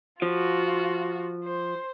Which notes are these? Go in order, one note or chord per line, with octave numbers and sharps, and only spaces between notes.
F3 F4 F#4
C5